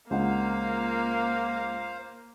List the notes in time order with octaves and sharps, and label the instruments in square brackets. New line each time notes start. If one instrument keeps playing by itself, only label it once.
[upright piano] C#2 G#3 F#5 [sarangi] A#3 [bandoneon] C5 F5